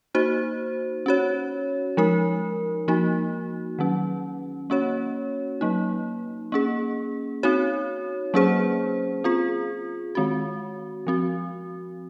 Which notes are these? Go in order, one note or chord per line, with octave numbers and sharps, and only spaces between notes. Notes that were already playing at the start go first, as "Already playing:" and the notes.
A#3 D#4 F#4 C5
C#4 F#4 C#5
F3 G#3 D#4 A#4
F3 A#3 D#4 F#4
D#3 F#3 C#4
A#3 C#4 F#4 C#5
F#3 A#3 D#4
A#3 C#4 G#4
C4 D#4 F#4 C#5
F#3 A#3 C#4 G#4 C5
C4 F4 G#4
D#3 G#3 C4 F#4
F3 C4 F#4